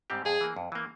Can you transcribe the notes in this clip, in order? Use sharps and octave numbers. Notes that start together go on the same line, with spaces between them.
G#2 G3 C4 G4
F2 G#4
E3 A#3
F2
E3 A#3